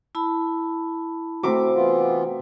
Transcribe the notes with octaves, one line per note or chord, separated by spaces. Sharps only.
E4 A5 B5
C3 A3 F#4 E5 D6
E3 B3 F4